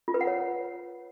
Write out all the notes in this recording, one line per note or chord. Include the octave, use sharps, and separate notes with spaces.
F4
B4
F#5
C#5